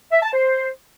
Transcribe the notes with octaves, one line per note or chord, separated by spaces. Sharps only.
E5
A5
C5